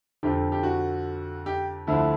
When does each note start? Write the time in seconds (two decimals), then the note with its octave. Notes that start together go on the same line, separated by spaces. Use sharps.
0.23 F2 D3 F3 G4
0.52 G4
0.63 F#4
1.46 G4
1.87 D2 D3 F3 E4